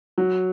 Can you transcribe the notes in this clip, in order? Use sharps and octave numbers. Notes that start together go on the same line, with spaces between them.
F#3